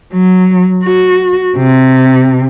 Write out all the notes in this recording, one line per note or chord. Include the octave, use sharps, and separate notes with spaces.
F#3
F#4
C3